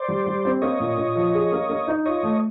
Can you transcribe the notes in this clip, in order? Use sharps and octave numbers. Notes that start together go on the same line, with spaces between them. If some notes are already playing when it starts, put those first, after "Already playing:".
Already playing: C5 D5
G3
G3
C4
A#3 C#5 D#5
A#2
A#2
F3
G#4
A#3
A#3
D#4
F4 C#5 D#5
A3